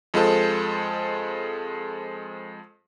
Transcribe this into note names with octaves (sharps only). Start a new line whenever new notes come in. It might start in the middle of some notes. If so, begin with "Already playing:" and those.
F2 G#3 F4 A4 C5